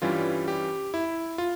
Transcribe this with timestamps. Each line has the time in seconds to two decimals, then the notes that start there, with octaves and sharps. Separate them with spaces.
0.02 G2 E3 G3 C#4 F4
0.48 G4
0.94 E4
1.38 F4